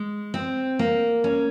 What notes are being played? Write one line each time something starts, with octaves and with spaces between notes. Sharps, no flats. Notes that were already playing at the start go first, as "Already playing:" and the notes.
Already playing: G#3
C4
A#3
C#4